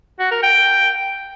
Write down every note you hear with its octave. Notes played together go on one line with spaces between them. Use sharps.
F#4
A#4
G5